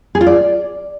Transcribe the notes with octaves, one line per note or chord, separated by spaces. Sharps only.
G#4
F4
D5